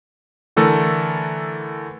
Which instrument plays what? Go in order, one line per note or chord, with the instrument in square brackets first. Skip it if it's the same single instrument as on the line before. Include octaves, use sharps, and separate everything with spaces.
[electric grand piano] D3 E3 A3 A4 A#4